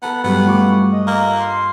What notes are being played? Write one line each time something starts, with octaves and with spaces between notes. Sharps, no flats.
B3 A4 A5 A#5
G2 F#3 G3 B3 C#4
A3 F4 C#6 D6
D#5
A#3
C6